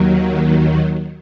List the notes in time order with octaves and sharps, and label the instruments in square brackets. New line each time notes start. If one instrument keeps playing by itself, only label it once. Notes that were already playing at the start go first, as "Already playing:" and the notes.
Already playing: [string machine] D#2 D#3 F#3